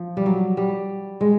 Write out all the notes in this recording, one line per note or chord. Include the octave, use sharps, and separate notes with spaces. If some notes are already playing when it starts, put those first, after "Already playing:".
Already playing: F3
G3
F#3
G3
G#3